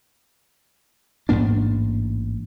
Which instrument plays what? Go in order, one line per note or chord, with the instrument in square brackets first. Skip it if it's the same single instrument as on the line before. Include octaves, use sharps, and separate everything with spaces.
[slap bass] A1 G#2 A#3 D4